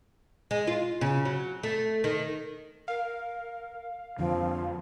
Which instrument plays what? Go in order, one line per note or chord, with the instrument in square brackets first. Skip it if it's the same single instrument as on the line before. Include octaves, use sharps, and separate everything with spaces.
[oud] G#3
F4
C#3
F#3
A3
D#3
[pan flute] A#4 [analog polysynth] F5
[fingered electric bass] F2 D3 [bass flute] F3 [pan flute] C4